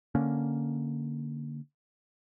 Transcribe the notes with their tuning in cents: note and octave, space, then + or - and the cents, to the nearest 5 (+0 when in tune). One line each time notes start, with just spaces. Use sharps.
D3 +0 A#3 +0 C#4 +0